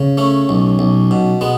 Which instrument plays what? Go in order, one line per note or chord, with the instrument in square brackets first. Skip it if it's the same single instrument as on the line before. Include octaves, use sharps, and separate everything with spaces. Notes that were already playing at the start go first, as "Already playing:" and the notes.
Already playing: [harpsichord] C#3
A3 C#4
B1
B1
B2
G#3 B3